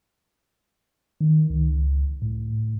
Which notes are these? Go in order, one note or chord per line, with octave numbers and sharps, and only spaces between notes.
D#3
C#2
A2